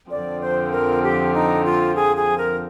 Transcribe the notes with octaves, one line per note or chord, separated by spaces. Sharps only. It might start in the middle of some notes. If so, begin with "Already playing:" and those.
F2 D3 F3 C4 D5
C5
A#4
G4
D#4
F4
G#4
G#4
A#4